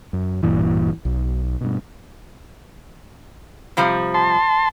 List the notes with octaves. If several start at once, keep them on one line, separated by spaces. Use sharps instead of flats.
F#2
D1 G2 A#2 E3
B1
G2 B2
C3 F3 G3
A5 C6